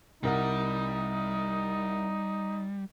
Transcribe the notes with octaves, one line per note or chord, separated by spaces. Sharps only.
C2 G3 D#4 A#4 F#5